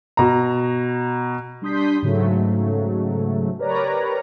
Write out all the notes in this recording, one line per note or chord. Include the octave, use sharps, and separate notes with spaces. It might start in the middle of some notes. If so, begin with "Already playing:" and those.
B2 A#5
G3 D4 C6 D#6 G6 B6
G#2 C#3 F#3 A3
G4 A#4 B4 C#5 D5 A#5